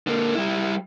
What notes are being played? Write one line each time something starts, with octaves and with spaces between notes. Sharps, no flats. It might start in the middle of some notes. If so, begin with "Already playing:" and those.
D3 A#3
G3 E4